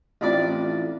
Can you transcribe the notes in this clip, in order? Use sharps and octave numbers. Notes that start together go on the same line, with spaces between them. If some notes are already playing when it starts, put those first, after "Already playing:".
A1 F2 D4 D5 D6